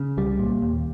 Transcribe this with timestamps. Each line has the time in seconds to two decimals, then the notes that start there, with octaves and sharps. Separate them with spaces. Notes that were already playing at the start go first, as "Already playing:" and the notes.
Already playing: C#3
0.17 C2 G3
0.39 A#2
0.62 D#2